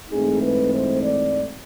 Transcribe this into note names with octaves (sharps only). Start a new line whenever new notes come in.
G#2 E3 A3 C4 D#4 G#4
B4
C5
D5